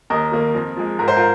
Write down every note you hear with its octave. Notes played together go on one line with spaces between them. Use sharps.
D#2 A#4 D#5
D#3 A#3
F2
F3 G#3
G#2 A#4
C5
F4 A#4